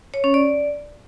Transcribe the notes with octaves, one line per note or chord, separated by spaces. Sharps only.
C#5
C#4
D5